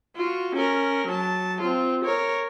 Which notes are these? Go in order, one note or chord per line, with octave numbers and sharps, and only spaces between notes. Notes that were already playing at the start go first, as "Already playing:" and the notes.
F4 F#4
C#4 A#4
F#3 A5
C4 F4
A#4 C#5